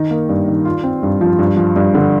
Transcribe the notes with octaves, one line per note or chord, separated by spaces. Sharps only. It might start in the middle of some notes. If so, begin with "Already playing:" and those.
Already playing: D#3 D#4
A#3
G2
D#3
F4
C4
G2
F3
G2
F3
G2
D3